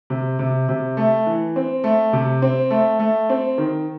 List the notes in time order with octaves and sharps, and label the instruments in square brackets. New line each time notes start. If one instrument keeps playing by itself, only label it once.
[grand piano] C3
C3
C3
A3
E3
C4
A3
C3
C4
A3
A3
C4
D#3